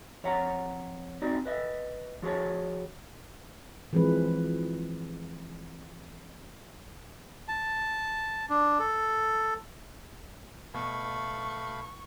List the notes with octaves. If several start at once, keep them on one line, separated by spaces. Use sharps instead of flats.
F2 C#5 E5 F#5 A#5
C4 D#4 F#4 D5
B4 D#5 E5
F3 F#4 G#4 C#5 A5
E3 F3 G#3 C4 B4
A5
D4
A4
B2 A3 F5 B5 C#6